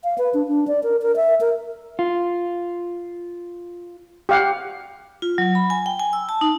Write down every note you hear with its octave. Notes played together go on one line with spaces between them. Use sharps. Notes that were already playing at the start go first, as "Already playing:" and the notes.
F5
B4
D4
D4
D5
A#4
A#4
E5
A#4
F4
G4 F5 F#5
F4
F#3
B5
G#5
G5
G#5
E6
A5
D#4